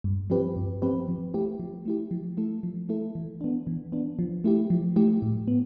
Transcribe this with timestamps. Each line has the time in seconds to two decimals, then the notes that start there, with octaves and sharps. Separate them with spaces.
0.04 G2
0.30 F3 C4 G4 B4
0.56 G2
0.82 F3 C4 G4 B4
1.08 F3
1.34 A3 E4 G4
1.60 F3
1.85 A3 E4 G4
2.11 F3
2.37 A3 E4 A4
2.63 F3
2.89 A3 E4 A4
3.15 E3
3.41 B3 D4
3.67 E3
3.92 B3 D4
4.19 F3
4.44 A3 E4 G4
4.70 F3
4.96 A3 E4 G4
5.22 A2
5.48 B3